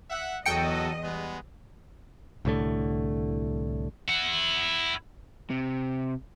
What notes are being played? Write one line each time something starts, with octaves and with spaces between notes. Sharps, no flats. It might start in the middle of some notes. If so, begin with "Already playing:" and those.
E5 F#5
E2 F#3 F#4 A4 D#5 G5 C#7
G3 G#3 B3
C2 A2 D3 A3
E4 F#5
C3